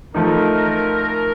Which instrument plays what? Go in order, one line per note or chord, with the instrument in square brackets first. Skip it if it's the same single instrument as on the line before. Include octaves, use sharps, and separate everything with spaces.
[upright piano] F3 A3 D#4 [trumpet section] A#4